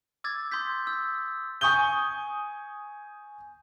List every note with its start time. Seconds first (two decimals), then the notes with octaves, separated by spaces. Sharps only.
0.24 D6 E6 G#6 A6
0.51 C6 D#6 G6 B6
0.87 E6 G6
1.61 G#5 C#6 D#6 G6 G7